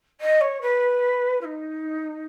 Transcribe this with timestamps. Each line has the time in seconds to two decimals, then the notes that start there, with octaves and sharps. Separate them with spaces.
0.20 D#5
0.41 C#5
0.61 B4
1.41 F4
1.44 D#4